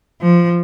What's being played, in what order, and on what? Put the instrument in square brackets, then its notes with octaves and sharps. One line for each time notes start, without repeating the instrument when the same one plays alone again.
[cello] F3